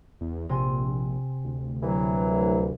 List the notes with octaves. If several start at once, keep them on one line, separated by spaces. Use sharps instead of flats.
E2
A#1 C3 G#5 C6
D2
C2 E3 F#3